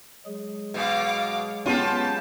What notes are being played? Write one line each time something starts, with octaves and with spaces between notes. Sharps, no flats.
F#3 G#3 G#4
B2 B3 F5 D6
B3 C#4 F4 G4 A5